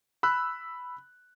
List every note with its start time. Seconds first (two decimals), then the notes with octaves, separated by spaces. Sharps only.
0.23 B5 E6 F#6